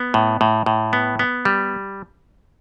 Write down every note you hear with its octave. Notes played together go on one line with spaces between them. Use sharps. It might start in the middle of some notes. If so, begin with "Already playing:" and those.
Already playing: B3
A2
A2
A2
B3
B3
G3